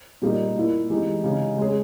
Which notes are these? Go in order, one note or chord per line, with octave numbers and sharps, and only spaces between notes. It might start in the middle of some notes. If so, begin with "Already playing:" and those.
A#2 G3 A#3 D#4
A#2 A#3 E4
E3 G#3 D#4 G4
C#3 G#3 D#4 G4
G#3 C#4 G#4